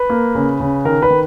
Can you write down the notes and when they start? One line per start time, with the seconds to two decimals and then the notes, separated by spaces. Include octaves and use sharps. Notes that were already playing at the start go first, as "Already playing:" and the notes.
Already playing: B4
0.10 A#3
0.35 C#3
0.60 C#3
0.85 D#3 A#4
1.02 B4
1.10 D#3